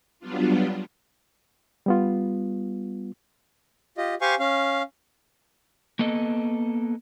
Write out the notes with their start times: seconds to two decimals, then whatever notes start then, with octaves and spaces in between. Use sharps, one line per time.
0.20 F#3 G3 B3 D4 F4
1.86 G3 B3 F4
3.98 F4 G4 D#5
4.21 G4 C5 F5 G#5 C#6
4.39 C#4 F5
5.99 A#3 B3 A4 D#5